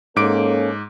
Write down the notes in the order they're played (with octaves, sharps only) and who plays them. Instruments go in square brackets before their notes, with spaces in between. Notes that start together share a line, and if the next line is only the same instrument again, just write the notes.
[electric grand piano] G#2 D6 D7 [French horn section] A#3 C#4 A4